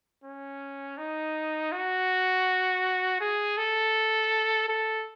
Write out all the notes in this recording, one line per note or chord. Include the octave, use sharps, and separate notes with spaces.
C#4
D#4
F#4
G#4
A4
A4